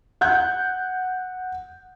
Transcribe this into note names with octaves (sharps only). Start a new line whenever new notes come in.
F#5 F#6 G6